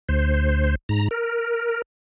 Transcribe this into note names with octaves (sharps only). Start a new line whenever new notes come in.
D2 C5
G#2 A#5
A#4